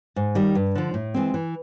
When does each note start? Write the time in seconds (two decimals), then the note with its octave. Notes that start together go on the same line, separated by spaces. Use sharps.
0.16 G#2
0.35 D#3 G3
0.55 G2
0.75 D3 F3
0.94 A2
1.14 E3 G#3 C4
1.34 E3